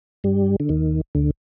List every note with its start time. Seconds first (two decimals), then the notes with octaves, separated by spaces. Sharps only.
0.24 G2 G3
0.60 D3
0.69 D#2 D#3
1.15 D2 D3